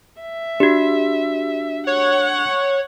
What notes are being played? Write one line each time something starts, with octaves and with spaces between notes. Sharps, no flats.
E5
D4 F#4 G4
C#5 F#5